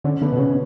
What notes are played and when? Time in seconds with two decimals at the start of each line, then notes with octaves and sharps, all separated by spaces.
0.04 D3 C#4
0.22 D3 B3
0.33 B2
0.39 C#3 C#4